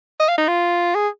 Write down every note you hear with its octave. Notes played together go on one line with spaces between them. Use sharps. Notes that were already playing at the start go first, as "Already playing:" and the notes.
D#5
F5
D#4
F4
G#4